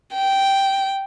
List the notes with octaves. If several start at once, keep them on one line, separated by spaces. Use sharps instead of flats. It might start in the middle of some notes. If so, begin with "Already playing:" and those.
G5